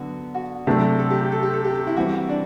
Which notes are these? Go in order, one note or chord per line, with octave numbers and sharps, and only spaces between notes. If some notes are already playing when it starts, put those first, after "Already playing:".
Already playing: D3 F#3 B3 F#4
F#4
C3 F#3 A3 D4 G4
A4
G4
G4
A4
G4
A4
G4
E4
E3 G3 C4 F#4
D4